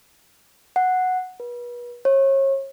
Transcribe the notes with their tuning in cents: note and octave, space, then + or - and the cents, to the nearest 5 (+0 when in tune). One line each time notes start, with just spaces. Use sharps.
F#5 -5
B4 -35
C#5 -35